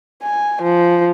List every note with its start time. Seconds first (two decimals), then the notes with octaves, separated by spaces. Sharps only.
0.23 G#5
0.62 F3